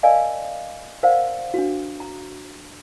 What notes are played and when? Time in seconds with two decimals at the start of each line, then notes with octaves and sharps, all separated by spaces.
0.03 A#4 D5 D#5 F5 G#5 A5
1.03 A#4 C5 D5 F5 F#5 A5
1.54 D4 F#4
2.00 A#5